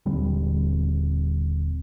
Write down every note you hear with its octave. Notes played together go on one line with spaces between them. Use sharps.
D#1 D3 G3 C4